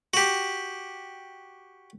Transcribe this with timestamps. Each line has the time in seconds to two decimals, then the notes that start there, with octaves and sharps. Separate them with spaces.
0.14 F#4 G4